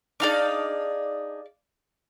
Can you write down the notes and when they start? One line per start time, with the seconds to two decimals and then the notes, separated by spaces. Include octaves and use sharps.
0.20 D4 D#4 G#4 D5 F5 D6